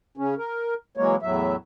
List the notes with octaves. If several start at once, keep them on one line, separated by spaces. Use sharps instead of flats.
C#3 C#4
A#4
E3 F#3 G#3 A#3 C#5
E2 A2 F#3 E5